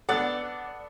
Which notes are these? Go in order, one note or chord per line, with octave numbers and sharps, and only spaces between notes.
B3 D4 A4 D5 F#5 D6 F#6